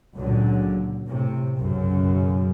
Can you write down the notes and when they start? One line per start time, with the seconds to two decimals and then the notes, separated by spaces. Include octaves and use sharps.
0.16 C#2 A#2 D3 F#3
1.06 A2 C3
1.56 B1 F#2 C#3